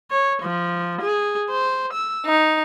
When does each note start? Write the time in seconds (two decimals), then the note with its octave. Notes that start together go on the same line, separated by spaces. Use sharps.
0.11 C#5
0.43 F3
1.03 G#4
1.50 C5
1.92 E6
2.27 D#4